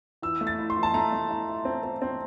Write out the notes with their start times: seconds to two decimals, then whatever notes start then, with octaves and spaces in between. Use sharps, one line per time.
0.22 E3 E6
0.41 A3
0.47 A6
0.59 E4
0.70 C6
0.77 E3
0.83 A5
0.94 A3 A#5
1.13 A3
1.31 E4
1.48 E4
1.65 C4
1.83 C4
2.02 C4